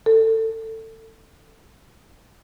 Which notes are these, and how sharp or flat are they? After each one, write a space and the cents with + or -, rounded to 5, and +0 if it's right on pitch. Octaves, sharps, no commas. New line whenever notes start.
A4 +25